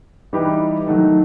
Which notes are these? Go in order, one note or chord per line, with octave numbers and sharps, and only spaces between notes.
E3 G3 D#4 G4 B4
D#3 F#3 A3 D#4